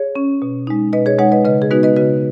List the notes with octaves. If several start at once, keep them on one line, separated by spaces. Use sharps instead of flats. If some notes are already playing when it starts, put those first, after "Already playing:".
Already playing: G#4 C#5
C#4
B2
G#3 D#4
B2 B4 D#5
G#4 C#5
G#3 D#4 C#5 F#5
B4 D#5
C#3 B4 D#5
G#4
G#3 B3 D#4 F#4 B4
B4 D#5
C#3 F#4 B4